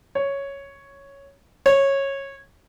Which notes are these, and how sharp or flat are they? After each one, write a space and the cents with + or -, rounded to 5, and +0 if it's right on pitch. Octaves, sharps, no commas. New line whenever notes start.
C#5 +0
C#5 -15